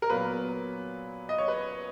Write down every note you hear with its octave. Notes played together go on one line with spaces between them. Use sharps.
A#4
A#2 F#3 B3 B4
D#5
C#5
B4